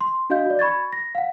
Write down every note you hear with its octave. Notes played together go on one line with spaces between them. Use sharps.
C6
D4 F#4 D#5 F5 G6
F#4 D5
B5 C#6 G#6 A6
A#6
F5 F#5